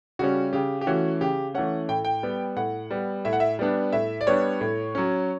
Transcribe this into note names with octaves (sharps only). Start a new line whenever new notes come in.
C#3 G3 C#4 F#4
C#3 G4
G4
E3 A3 C#4 F#4
C#3 G4
E3 A3 C#4 F#5
A2 G5
G5
G3 B3
A2 F#5
G3 B3
A2 E5
F#5
E5
G3 B3 D4
A2 E5
D5
G3 B3 D4 C#5
A2
F#3 C#4